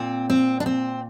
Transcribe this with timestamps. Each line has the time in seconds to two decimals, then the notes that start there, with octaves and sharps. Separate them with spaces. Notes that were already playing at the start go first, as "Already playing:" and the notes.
Already playing: A#2 C4
0.30 C4
0.60 D4
0.66 C4